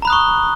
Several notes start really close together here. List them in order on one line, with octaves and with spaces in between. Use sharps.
A#5 B5 F#6 D#6 C#6